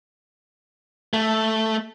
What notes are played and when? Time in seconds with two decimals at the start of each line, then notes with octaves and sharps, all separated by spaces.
1.13 A3